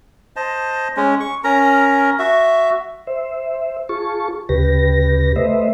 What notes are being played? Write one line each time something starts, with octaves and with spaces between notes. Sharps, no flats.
C5 D#5 A5
G#3 C#4
C#6
C#4 A#4 A#5
F#4 E5
C5 E5
F4 G#4 A5 C#6
D2 C#3 G4 B4 A#6
A3 B4 C5 D#5 E5